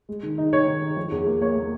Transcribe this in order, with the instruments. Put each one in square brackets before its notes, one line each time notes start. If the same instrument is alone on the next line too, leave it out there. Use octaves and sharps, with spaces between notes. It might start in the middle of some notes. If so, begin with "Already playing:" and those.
[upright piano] G#3
D#3
D#4
D#4 C#5
D#3
D#4
F3
E2
A#3
A#3 C#5
A#3